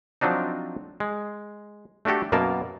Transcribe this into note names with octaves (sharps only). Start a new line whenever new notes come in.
F3 F#3 C4 D4 D#4
G#3
A3 D4 F#4 G4 A4
F#2 B2 A#3 A#4 A5